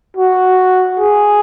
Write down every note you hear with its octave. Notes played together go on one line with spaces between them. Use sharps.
F#4
G#4